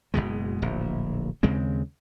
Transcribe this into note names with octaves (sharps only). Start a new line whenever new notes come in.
F#1 B1 B2 G#3
D1 A#1
D#2 C#3 G#3 C4